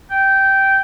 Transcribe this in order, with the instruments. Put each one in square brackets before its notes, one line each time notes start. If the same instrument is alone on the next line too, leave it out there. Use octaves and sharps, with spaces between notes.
[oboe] G5